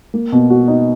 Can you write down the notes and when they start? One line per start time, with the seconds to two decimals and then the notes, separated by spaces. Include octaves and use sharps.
0.14 A#3
0.32 B2
0.50 F#4
0.68 D#4